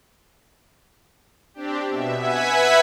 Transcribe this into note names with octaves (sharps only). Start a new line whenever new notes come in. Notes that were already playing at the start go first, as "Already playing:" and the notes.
C4 D4 G4
B2 E5
B4 E5 F#5 G#5 G#6 B6